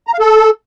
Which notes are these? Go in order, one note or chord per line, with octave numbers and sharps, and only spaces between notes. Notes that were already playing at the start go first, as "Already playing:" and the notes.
A#5
F5
A4